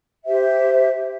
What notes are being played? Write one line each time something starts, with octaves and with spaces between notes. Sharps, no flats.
G4 C5 E5